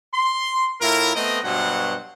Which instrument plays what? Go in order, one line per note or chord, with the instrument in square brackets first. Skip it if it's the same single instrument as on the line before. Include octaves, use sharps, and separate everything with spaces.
[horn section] C6
A2 E4 F4 A#4
A3 B3 C4 D#5
G2 B2 F#3 C5 F#5